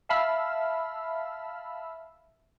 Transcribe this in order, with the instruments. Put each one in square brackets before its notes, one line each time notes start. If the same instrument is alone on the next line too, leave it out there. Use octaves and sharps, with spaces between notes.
[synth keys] E5 F5 A5 B5 E6 F6